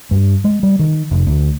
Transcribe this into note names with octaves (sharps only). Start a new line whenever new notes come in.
G2
G#3
G3
D#3
F1
D2